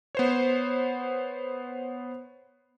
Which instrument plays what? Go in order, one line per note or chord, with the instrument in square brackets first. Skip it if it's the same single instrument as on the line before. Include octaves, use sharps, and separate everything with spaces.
[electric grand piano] B3 C5 C#5